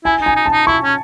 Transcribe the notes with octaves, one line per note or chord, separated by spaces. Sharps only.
E4 G#5
D#4
G#5
D#4
A5
D#4
E4 C#6
C#4